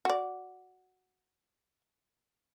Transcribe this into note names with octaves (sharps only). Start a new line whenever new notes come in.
F#4 D5